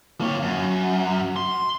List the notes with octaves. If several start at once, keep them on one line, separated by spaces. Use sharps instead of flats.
A#3 C#5
F#2
C6